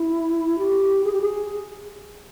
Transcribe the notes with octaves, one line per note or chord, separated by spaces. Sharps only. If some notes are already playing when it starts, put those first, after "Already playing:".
Already playing: E4
G4
G#4
G4
G#4